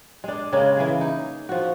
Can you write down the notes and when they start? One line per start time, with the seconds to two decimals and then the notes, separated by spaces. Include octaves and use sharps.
0.24 G#3 D4
0.53 C#3 G#3 A#3 C#4
0.77 E3 A#3 G#4
1.01 D#4
1.49 F3 F#4